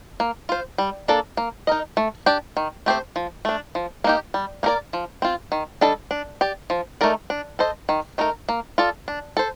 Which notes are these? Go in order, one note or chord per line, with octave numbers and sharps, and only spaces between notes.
A#3
F4 C5
G3
A#3 D4 A4 D5
A#3
D#4 A#4 D#5
A3
D4 G4 D5
D#3
A3 C4 G4 C5
F3
A3 D4
F3
A#3 D#4 G4
G3
A#3 D#4 A#4 D5
F3
C4 F4
D#3
G3 D4 A4 D#5
D4
G4 D5
F3
A3 D#4 A#4 D5
D4
A4 C5 D#5
D#3
A3 D#4 A#4
A#3
F4 A4 D5
D4
A4 C5